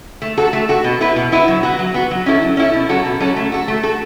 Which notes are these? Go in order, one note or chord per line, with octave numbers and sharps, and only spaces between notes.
A3
F#4 A4
A3
F#4 A4
B2
B3 E4 B4
B2
B3 E4 B4
F#3
B3 F#4
F#3
B3 F#4
F#3
C#4 E4 A4
F#3
C#4 E4 A4
B2
F#3 C#4 F#4 A4
B2
F#3 C#4 F#4 A4
A3
F#4 A4
A3
F#4 A4